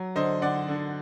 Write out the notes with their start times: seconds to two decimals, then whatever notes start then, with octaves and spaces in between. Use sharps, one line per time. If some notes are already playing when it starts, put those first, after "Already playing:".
Already playing: F#3
0.15 D3 C5 D#5
0.42 D3 D5 F#5
0.68 D3